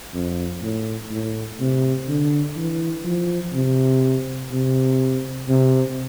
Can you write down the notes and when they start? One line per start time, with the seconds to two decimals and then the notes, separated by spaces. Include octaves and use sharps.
0.14 F2
0.62 A2
1.11 A2
1.60 C3
2.08 D3
2.57 E3
3.05 F3
3.54 C3
4.52 C3
5.49 C3